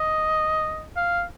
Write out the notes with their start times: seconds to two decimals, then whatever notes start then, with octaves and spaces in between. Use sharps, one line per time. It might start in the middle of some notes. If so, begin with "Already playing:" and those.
Already playing: D#5
0.96 F5